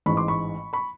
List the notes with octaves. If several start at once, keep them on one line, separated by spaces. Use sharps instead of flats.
A1 G#2 E3 B5 C#6
C6 D6
B5 C#6
B5 C#6